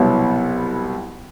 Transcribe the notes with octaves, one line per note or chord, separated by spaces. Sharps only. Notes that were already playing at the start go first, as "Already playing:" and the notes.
Already playing: C2 B2 F#3 B3 E4